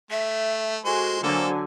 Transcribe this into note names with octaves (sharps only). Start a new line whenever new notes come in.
A3 E5
G#3 F#4 A4 C5 G#5
D3 F#3 A#3 A4 C5 G#5